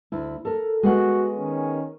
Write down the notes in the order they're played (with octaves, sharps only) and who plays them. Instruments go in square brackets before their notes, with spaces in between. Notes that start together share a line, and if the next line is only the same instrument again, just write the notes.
[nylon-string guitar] D2 E4
A4 A#4
[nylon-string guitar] G#3 B3 F#5 [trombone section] F#4
[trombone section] D#3 C#4